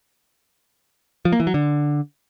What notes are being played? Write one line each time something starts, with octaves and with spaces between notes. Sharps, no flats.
F3
A#3
E3
F#3
D3